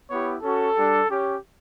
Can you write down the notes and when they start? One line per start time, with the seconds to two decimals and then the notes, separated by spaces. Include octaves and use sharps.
0.11 B3 E4 G4 C#5
0.43 C#4 F#4 A4
0.76 G3 D4 G4
1.10 C#4 G4